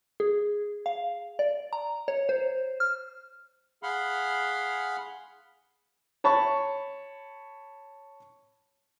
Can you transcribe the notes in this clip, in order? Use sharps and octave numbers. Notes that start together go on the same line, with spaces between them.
G#4
F5
D5
A#5
C#5
C5
F6
G#4 F5 F#5 B5 C6 F6
C#5 A5 B5 C#6